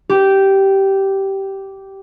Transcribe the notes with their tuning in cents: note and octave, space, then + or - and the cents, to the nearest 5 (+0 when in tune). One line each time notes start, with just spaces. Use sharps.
G4 -10